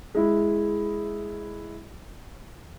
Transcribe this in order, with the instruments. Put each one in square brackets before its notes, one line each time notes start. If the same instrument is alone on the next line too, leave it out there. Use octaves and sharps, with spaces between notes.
[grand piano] G#3 E4